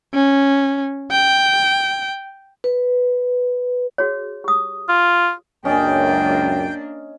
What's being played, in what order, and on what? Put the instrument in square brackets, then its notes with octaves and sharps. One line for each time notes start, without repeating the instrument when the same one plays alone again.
[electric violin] C#4
G5
[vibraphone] B4
[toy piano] F#4 G#4 C#5
G4 D#6
[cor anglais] F4
[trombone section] C#2 F#2 [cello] A#3 D4 [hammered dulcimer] C#4 D#5 [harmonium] G5